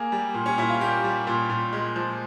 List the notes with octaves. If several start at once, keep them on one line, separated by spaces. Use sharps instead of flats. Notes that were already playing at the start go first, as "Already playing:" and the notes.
Already playing: A#3 G#4
G3
A#2
C#4
A#2 E4
F4
A#3 G4
G3
A#2
A#2
G#3
F3